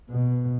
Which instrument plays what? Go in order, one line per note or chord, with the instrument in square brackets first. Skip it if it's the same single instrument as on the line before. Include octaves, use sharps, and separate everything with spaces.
[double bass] B2